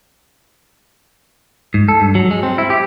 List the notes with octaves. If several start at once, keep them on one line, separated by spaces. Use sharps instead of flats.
G#2
A4
G2
F#3
G#3
C4
E4
G4